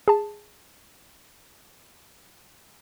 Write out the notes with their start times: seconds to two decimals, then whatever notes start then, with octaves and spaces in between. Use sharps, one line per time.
0.08 G#4 A5